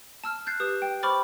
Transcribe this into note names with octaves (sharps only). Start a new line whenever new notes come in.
A5 E6 F6
F#6 G6 A6 C7
G4 B4 D#6
G5
C5 B5 C#6 D6 F6 A6